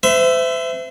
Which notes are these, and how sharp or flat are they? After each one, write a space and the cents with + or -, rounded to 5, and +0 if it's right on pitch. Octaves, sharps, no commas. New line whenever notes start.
C5 -40 E5 +10